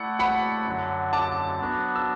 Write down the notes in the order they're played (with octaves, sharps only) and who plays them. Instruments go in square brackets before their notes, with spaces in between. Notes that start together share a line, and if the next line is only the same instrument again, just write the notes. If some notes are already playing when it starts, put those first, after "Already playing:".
Already playing: [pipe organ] A3 E4 D5 [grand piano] F#5
[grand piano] F#5 B5
[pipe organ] F#2 D3 F#3
[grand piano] A5 D6
[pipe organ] F#3 B3 D4 F#4
[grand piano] E6